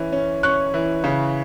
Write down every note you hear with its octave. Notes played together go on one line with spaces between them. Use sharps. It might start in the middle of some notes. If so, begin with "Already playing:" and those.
Already playing: E3 C#4
C#4
C#4 C#6 F#6
E3
C#3